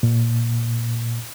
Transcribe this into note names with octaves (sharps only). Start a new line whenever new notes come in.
A#2